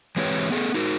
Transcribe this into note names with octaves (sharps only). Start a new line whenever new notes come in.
E3 G#3 C4 G4 B4 C#5
B3 G#4 A4
D#4 F#4 A#4